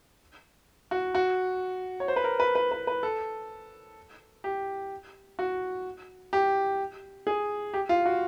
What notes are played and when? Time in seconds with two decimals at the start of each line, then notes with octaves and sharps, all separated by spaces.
0.91 F#4
1.15 F#4
2.00 C#5
2.08 C5
2.16 B4
2.24 A#4
2.40 B4
2.55 B4
2.72 B4
2.87 B4
3.03 A4
4.44 G4
5.39 F#4
6.33 G4
7.27 G#4
7.74 G4
7.89 F4
8.06 F#4